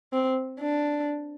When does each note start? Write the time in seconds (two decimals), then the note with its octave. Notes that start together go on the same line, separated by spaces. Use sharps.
0.13 C4
0.60 D4